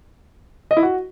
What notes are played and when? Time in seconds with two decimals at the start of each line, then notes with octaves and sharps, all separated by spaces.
0.71 D#5
0.77 E4
0.83 F#4